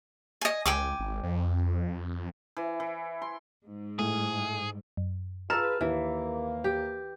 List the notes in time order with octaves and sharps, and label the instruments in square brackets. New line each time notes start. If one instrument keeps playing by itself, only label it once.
[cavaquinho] D#5 G#5
[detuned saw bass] C#2 [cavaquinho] G5 G#5 D6
[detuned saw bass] G#1
F2
[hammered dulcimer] E3
E3
C6
[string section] G#2
[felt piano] A2 [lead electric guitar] G#4
[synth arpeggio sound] F#2
[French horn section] F4 G#4 B4 [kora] A4 [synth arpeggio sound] A#5 E7 [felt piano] E6 F6
[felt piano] D#2 [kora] E3 [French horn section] A#3
[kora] G4